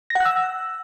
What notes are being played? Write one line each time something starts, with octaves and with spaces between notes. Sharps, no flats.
A#6
F#5
F#6
E6